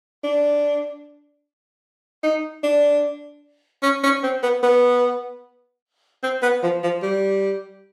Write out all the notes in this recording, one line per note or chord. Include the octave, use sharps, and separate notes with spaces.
D4
D#4
D4
C#4
C#4
C4
B3
B3
C4
B3
F3
F3
G3